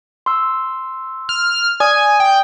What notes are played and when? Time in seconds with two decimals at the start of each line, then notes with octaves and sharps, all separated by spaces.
0.26 C6 E6
1.29 F6
1.80 D5 G#5 D#6
2.20 G5